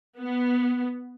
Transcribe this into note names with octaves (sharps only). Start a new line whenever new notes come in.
B3